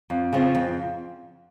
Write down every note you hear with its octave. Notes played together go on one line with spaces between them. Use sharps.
F2
C#3 F3 C4
F2